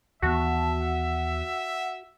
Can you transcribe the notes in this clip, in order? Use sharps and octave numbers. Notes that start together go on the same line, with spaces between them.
D#2 E3 B3 F#4 E5 A5
F#5